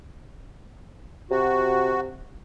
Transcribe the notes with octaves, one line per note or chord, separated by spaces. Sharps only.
C3 F#4